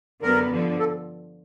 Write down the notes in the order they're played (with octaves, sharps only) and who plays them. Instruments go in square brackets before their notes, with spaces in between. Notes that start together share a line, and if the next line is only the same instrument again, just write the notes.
[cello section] F#2 D3 G3 B3 [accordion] A#4
[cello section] G2 D3 F3
[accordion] A4